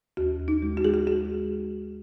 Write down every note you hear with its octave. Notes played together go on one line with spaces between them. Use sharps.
D#2 F#4
D#2
D#4
G#3
F#4
G#3 G#4
F#4
F#4